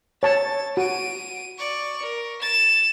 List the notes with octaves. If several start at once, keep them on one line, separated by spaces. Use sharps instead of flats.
C#5 A5 A6
F#4 D7 D#7
D5 C#6
A#4
A6 E7